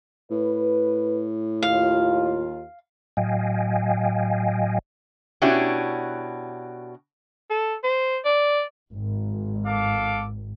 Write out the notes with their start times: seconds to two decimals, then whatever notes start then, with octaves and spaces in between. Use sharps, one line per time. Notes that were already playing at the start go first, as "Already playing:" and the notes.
0.31 A2 B4
1.62 D#2 F4 F5
3.17 A2 F#3 D#5 F5 G5 G#5
5.42 B2 C#4 D4 E4 F#4 G4
7.50 A4
7.83 C5
8.25 D5
8.93 G#1
9.67 A4 F5 D6